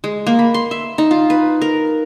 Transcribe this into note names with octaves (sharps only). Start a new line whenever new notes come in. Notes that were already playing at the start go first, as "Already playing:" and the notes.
G#3
A#3
B5
C6
E5
D#4
F4
B4
A#4